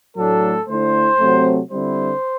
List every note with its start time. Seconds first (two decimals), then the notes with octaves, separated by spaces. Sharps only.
0.16 A2 F#3 A3 D4 A4
0.67 D3 A3 E4 C5
1.19 C3 F#3 A3 C4
1.70 D3 G3 C4 E4 C5